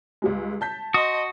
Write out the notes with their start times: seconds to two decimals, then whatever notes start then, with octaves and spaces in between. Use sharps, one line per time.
0.22 C#2 G3 G#3
0.61 A5 G6 B6
0.94 F#4 D#5 C6 D#6